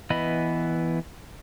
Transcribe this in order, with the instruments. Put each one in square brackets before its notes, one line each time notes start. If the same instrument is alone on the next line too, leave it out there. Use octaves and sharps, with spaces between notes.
[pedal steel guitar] E3 B3 D#5 B5